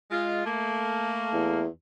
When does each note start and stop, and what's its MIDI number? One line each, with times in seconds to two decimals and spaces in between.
0.11 0.46 56
0.11 0.46 65
0.46 1.62 57
0.46 1.62 58
1.33 1.67 40